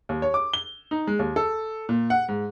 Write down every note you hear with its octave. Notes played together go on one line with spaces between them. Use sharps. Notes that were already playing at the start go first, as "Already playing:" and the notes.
D#2
C#5
D6
G7
D#4
G#3
D#2
A4
A#2
F#5
G#2